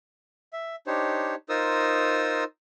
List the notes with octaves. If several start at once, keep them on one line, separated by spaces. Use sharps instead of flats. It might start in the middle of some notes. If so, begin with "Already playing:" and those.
E5
D4 D#4 G4 C5 C#5
D#4 F4 A#4 C5 D#6 E6